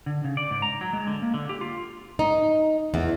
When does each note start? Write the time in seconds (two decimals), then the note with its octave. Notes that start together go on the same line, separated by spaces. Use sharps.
0.06 D3
0.24 C#3
0.37 D5
0.51 G#2
0.62 A#5
0.81 F#3
0.93 G#3
1.07 D3
1.22 A#3
1.34 D3
1.49 G4
1.61 F4
2.19 D#4
2.94 E2